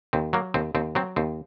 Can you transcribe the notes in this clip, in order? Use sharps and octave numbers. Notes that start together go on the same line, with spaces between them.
D#2 C4
F#3 A#3
D#2 C4
D#2 C4
F#3 C4
D#2 C4